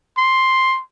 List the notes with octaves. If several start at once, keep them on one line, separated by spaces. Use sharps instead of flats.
C6